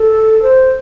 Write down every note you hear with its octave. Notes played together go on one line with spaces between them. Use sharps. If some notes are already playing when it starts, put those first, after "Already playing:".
Already playing: A4
C5